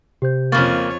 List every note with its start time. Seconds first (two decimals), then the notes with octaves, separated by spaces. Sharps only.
0.22 C3 G4 C5 G6
0.52 F2 C#3 A#3 C#5 B5 C#6 A6